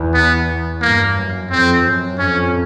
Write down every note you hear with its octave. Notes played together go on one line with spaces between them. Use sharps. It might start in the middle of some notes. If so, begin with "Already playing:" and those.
Already playing: E2
B3
G2 A#3
F#2
F2 C4
F#2
F2 C#4